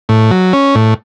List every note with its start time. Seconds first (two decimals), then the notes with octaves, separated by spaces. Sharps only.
0.09 A2
0.31 F#3
0.53 C#4
0.75 A2